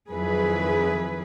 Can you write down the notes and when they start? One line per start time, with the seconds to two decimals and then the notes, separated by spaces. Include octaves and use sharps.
0.11 F2 D#3 F#3 E4 G#4 B4